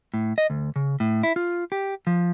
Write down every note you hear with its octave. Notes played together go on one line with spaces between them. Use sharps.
A2
D#5
D2
C#3
A2
E4
F4
G4
F3